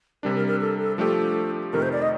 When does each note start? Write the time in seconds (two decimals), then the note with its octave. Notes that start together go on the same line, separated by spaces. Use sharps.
0.23 C3 G3 D4 A#4
0.36 A#4
0.47 A#4
0.61 A4
0.79 A4
0.98 F3 A3 D4 G4 A4
1.73 F2 C3 D#3 A3 A#4
1.82 C5
1.92 D5
2.02 D#5